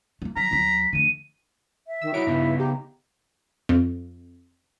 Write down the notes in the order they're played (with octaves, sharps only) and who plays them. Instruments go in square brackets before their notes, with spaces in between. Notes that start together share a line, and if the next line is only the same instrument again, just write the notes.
[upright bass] A3 A#3
[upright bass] F#3 [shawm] A#5 [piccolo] B6
[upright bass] D#2 F#3 [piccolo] B6
[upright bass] D3 A3 [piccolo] D#7
[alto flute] E5
[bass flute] D#3 [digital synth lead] E6
[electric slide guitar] D#4 F#4 C#5 [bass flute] E4 [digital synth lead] D7
[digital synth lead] G2 [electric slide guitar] C#3 B3 D#4
[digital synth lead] G4 [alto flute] A#5
[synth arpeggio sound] F2